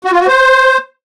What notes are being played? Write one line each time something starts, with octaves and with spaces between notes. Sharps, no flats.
F#4
F4
F#4
C5